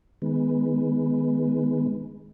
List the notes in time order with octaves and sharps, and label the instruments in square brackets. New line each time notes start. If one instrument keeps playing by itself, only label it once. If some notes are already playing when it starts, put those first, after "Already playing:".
[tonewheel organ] D#3 G#3 B3